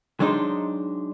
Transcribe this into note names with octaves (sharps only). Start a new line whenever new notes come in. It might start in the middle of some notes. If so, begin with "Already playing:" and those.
F#3 G#3 D4 D#4 C5